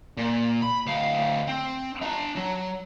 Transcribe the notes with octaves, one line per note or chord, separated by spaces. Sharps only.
A#2
B5
D2 F5
C4
D4 A#5
F#3